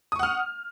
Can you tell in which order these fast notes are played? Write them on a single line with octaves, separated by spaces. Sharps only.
D#6 C#6 F#5 F6